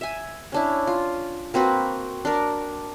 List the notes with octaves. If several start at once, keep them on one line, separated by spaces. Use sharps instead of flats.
E5 G#5
C#4 D4 E4
F4
A#3 C4 F#4 B4
D4 A#4